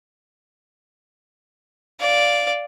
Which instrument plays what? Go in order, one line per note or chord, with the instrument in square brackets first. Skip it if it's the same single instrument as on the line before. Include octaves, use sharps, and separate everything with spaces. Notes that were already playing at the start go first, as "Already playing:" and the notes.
[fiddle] D5 F5